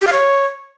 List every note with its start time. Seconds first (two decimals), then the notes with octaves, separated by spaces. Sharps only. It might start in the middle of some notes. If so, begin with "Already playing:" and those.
0.02 G4
0.07 F5
0.13 C#5